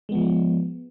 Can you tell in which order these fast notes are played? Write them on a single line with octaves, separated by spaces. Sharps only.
G#3 B3 F3